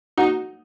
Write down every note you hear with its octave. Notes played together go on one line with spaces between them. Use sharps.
D#4 F#4